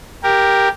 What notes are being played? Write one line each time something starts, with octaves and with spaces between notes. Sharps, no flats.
G4 A#4